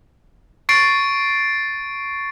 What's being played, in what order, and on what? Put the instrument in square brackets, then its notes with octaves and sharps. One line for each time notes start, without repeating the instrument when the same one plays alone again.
[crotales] C#6 A6 C7 D7